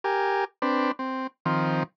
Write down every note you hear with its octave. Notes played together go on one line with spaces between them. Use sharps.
G4 A#4 G#5
C4 D4 B4
C4
D#3 F3 C4